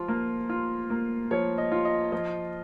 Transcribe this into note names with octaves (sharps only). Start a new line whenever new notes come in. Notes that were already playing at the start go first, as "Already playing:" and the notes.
Already playing: F3 F4
A#3
F4
A#3
F3 C#5
D#5
F4
D#5
F3 D#5